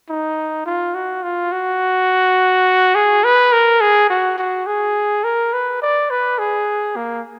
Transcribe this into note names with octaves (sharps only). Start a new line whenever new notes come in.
D#4
F4
F#4
F4
F#4
G#4
B4
A#4
G#4
F#4
F#4
G#4
A#4
B4
D5
B4
G#4
A#3